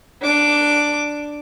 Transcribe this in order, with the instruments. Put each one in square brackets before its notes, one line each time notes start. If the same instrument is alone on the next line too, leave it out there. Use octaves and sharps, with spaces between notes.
[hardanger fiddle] D4 D6